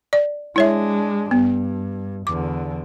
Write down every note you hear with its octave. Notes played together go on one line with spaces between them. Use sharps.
D5
G#3 D4 E4 C#5 E5
G2 B3
E2 D3 D6